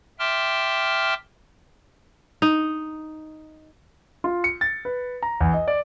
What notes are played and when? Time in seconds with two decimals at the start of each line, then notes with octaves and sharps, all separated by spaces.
0.19 E5 G5 A5 C6 D6 F6
2.42 D#4
4.24 F4
4.44 C#7
4.61 A6
4.85 B4
5.23 A#5
5.40 E2
5.53 D#5
5.68 D5